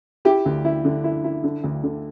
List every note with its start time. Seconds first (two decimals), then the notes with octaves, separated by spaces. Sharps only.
0.25 E4 G4
0.46 D2
0.65 E4
0.85 D3
1.04 E4
1.24 E4
1.44 D3
1.64 D2
1.83 D3